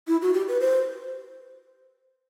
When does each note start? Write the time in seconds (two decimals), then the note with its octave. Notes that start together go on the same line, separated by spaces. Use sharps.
0.07 E4
0.22 F#4
0.34 G4
0.48 B4
0.60 C5